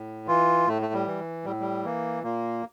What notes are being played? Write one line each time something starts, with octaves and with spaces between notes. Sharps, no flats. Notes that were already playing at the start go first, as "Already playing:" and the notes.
Already playing: A2
E3 F4
A2 A3
A3
G3
E3
A2 G3
G3
E3 A#3
A#2 A#3